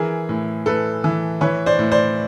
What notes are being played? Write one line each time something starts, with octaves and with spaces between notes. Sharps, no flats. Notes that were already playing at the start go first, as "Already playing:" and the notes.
Already playing: E3 G#4 A#4
A2
A2 A4 B4
E3
E3 B4 C#5
C5 D5
A2
C5 D5